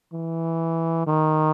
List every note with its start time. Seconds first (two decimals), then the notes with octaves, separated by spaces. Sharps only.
0.13 E3
1.07 D#3